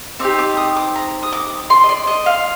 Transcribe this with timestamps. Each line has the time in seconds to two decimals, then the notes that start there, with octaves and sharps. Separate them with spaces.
0.19 C4 D#4 G4 D6
0.39 D6
0.57 D#6
0.76 D6
0.95 A#5
1.23 D#6
1.33 D6
1.70 C6
1.84 D#5
1.89 D5
2.07 D#5
2.26 F5